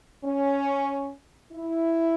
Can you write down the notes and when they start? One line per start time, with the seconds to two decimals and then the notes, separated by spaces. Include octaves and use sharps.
0.25 C#4
1.53 E4